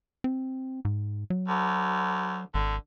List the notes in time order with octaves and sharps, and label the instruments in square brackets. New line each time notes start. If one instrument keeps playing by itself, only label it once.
[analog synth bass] C4
G#2
F#3
[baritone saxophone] D2
[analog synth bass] G#1 [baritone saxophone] D3